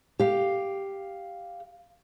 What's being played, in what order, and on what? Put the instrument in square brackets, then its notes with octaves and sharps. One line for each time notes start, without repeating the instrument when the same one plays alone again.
[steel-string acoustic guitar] G4 F5